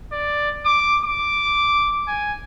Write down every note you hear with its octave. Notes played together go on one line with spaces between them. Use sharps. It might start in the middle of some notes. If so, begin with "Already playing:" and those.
D5
D6
D6
G#5